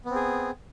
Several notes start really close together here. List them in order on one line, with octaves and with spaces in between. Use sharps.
B3 C4 G#4